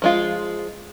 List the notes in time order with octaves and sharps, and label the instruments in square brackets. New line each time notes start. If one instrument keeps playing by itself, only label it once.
[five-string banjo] F3 G#3 F4